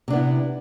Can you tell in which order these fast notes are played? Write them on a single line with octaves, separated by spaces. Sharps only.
C3 D4 B3 E4